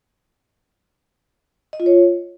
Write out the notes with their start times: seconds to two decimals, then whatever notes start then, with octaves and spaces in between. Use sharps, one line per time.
1.73 D#5
1.80 F4
1.86 C#5